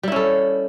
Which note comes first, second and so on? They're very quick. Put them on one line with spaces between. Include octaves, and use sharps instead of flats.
G3 E4 C#4 A4